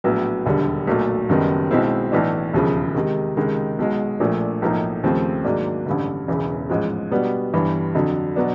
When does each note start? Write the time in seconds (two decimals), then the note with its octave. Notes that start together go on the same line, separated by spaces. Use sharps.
0.04 A#1 A2 F#3 B3
0.46 E1 D#2 D3 G3
0.87 B1 A#2 F#3 A3
1.29 F#1 F#2 D#3 G3 B3
1.71 B1 B2 G#3 C4 E4
2.12 B1 A2 E3 A3 D4
2.53 E1 D#2 C#3 F3
2.95 C3 D#3 G#3
3.37 C#2 C3 D#3 G#3
3.79 B1 B2 G#3
4.20 A#1 A#2 F3 A3 D4
4.62 B1 A2 F3 A#3 D#4
5.03 D#2 C#3 F3 A3 C4
5.45 G#2 D#3 F#3 A#3 D4
5.86 A1 G2 D3
6.28 E1 E2 C#3 E3
6.69 A1 G#2 F3 G#3
7.11 B2 G3 B3 D4
7.53 G1 G2 E3 G3
7.95 F2 D3 F#3
8.36 B2 F#3 B3 D4